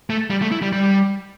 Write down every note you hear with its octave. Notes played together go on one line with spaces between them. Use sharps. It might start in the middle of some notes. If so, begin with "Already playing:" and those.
A3
G3
A3
E4
G3
G3